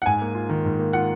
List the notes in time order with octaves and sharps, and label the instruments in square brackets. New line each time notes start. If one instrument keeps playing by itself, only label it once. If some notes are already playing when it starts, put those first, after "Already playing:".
[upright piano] F#5
[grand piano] G#2 [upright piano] G#5
[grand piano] A#3
F4
D#3
G#2
A#3
[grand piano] F4 [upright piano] F#5